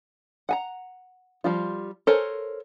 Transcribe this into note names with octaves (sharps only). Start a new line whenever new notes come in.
F#5 G#5 A#5
F3 G3 F4
A4 A#4 C5 C#5 G#5